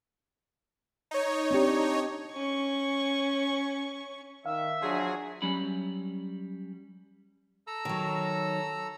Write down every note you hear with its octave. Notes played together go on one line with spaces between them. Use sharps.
D#4 C#5
C4 D4 G4
C#4 C#6
D#3 E5 F5
F3 F#3 D4 G#4
F#3 G3 C#4 B5
A4 A#5 E6
D#3 F#3